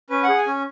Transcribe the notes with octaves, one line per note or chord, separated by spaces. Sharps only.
C#4 B4
F#5
G#4
G#5
C#4